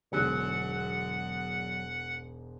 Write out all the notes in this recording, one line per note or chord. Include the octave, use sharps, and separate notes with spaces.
E1 G#2 D3 F#3 G#3 B3 F#5 G#5